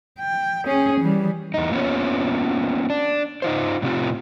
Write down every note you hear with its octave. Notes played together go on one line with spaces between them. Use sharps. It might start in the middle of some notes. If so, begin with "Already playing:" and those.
G5
C#4 G#4
E3 G3
E2 D#4
A#3 B3 C#4 F4 C#5
D4
D#4 F4 C5
A2 C3 F#3 C4 F4 G4